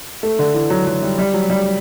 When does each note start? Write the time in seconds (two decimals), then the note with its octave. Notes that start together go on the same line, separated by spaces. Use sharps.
0.23 A3
0.39 D3
0.54 E3
0.70 F#3
0.87 F#3
1.02 G3
1.18 G3
1.34 F#3
1.50 G3